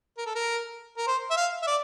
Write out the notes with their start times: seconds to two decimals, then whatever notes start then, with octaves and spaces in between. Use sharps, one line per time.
0.18 A#4
0.27 A4
0.36 A#4
0.98 A#4
1.07 C5
1.31 E5
1.37 F5
1.63 E5
1.67 D5